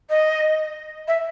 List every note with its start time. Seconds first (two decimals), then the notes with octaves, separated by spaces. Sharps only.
0.10 D#5
1.08 E5